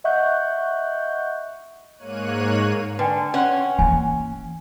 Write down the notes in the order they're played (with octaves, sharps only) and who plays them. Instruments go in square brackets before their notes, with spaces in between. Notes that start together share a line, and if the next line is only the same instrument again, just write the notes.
[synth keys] D#5 E5 F#5 C#6 F#6 G6
[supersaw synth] G#2 A#3 C#5 F#6 D#7
[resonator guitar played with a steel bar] D3 [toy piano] B4 G5 G#5
[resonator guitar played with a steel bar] C#4 [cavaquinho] F#5 C6
[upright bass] E3 A#3 [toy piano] G#5